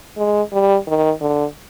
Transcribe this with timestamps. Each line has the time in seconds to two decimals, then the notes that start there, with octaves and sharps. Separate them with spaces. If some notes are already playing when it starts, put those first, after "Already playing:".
0.18 G#3
0.52 G3
0.87 D#3
1.21 D3